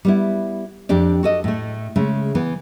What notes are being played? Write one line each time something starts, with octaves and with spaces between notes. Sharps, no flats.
G3 B3 E4
F2 D4 G4 D5
F#4 A4 D#5
A2 A3
C#3 G#3 A3
E3 B3